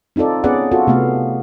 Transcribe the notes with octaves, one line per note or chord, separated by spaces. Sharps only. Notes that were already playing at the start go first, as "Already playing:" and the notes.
C4 D#4 F4 A4 D5
B3 C#4 G#4 B4 D5 F#5
F4 F#4 A4
C3 A3 B3 F5